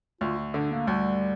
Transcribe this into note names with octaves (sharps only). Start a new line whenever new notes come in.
D2 F4
D3 D4
A#3
D2 G3